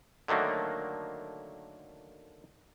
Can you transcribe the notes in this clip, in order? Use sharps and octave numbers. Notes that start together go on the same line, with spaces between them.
D3 D#3 F#3 A3 A#3